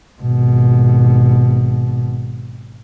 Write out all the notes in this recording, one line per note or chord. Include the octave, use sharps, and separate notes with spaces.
G#1 B2